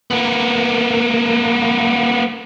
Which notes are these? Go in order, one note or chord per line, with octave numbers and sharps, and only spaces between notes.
A#3 B3